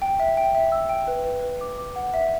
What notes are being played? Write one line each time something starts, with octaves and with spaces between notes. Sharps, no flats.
G5
E5
G5
E5
E6
G5
B4
B4
B4
D6
D6
F#5
E5